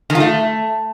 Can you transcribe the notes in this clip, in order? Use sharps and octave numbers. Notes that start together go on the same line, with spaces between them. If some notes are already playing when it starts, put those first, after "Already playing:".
D#3
F4
A3